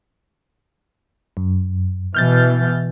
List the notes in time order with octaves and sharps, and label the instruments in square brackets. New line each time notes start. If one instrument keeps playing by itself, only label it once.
[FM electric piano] F#2
[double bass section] B2 E3 [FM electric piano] F6 G6 A6